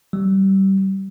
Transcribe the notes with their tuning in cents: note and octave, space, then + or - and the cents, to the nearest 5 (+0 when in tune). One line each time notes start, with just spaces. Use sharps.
G3 -25